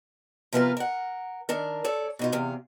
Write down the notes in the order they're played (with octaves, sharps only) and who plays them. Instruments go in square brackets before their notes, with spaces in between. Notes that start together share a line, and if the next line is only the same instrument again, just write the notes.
[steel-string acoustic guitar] C3 F3 B3 F4 A#4 B4
A#4 F#5
D#3 D4 A#4
A4 C#5 D5
B2 D#4 F4
E2 C3 F5